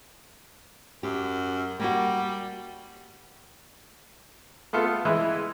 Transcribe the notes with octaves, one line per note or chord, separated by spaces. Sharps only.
F#2 G4
G3 A#3 F#4
A3 B3 F4 A4
E3 G#3 E4